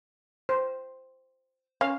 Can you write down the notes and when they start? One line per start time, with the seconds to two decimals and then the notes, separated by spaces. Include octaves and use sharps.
0.49 C5
1.81 C#4 F5